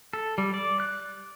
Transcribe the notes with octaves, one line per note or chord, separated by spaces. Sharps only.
A4
G3
D5
F#6